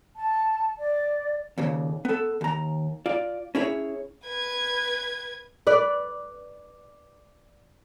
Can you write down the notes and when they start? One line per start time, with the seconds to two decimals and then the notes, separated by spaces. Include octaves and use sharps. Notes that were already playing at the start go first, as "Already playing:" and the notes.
0.16 A5
0.78 D5
1.58 D#2 A#2 C#3
2.05 B3 A4
2.41 D#2 A#5
3.06 F4 D5
3.55 C#4 E4 G#4 C#5
4.26 B4 G#6
5.67 B4 D5